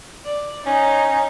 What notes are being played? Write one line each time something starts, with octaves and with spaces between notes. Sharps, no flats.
D5
C#4 D#4